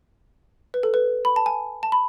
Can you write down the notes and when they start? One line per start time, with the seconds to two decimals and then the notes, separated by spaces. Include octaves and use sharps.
0.74 B4
0.83 A4
0.94 B4
1.25 B5
1.36 A5
1.46 G#5
1.83 A5
1.92 B5